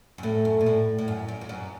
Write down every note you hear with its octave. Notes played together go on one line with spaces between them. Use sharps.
F#2
A2 A3
F#2
A#2
A2
A2
F#2
F#2
F2
F#2